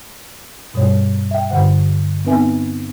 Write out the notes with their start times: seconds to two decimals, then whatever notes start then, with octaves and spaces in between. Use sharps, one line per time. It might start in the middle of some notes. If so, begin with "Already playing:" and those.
0.74 G2 B2 G3 C#5
1.31 E5 G5
1.50 G2 D3 C5 F#5
2.25 B3 C4 D#4 B4 E5 G#5